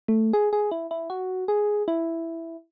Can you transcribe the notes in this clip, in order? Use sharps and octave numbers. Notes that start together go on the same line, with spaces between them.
A3
G#4
G#4
E4
E4
F#4
G#4
E4